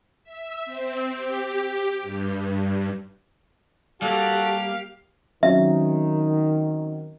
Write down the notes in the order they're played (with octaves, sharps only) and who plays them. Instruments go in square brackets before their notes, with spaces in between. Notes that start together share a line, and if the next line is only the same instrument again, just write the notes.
[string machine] E5
C4
G4
G2
[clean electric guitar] G3 A#3 [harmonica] F#4 A4 F#5 [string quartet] G4 [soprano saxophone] F5
[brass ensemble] D#3 [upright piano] F#3 C4 C#4 [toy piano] E5